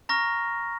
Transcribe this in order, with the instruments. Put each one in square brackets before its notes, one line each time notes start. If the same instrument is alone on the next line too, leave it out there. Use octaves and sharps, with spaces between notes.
[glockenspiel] A#5 C#6 F6 A#6